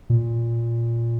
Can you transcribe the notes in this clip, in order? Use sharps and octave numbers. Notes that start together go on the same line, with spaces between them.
A#2